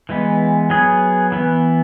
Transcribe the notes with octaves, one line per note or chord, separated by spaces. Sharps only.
E3 G#3 B3
F#3 B3 G#4
E3 B3